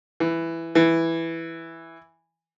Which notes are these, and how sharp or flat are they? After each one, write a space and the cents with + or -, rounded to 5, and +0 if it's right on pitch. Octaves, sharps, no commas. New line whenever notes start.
E3 +5
E3 +0